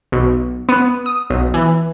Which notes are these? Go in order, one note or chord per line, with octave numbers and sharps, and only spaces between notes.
B1
B3
D#6
B1
E3